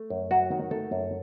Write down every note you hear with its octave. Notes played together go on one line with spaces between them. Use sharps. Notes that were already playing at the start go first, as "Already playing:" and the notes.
Already playing: A3
F#2
F#3 F#4
D#3
A3 A4
F#2